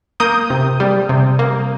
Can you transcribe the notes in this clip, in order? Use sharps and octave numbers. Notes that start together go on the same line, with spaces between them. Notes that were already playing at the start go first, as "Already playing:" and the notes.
A#3 D#6 G6
C3
G3
C3
A#3